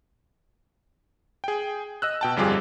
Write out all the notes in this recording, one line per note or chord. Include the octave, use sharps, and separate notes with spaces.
G#4 G5
D#5 E6 F#6
B2 G5 A5
G1 F2 G3 F4 G#4 D6